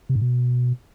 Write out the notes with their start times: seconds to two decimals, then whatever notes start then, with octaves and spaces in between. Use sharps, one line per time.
0.09 C3
0.15 G#2
0.21 B2